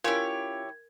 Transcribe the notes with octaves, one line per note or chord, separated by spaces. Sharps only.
C#4 E4 F4 G4 A#4 C#5 G#5 G#6